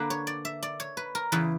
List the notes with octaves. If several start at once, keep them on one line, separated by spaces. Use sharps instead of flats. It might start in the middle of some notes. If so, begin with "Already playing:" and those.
Already playing: D3 A#3 D4 B4
C#5
D5
E5
D5
C#5
B4
A#4
E2 C#3 E3 B4